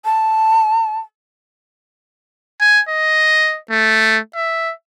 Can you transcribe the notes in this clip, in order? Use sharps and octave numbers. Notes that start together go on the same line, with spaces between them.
A5
G#5
D#5
A3
E5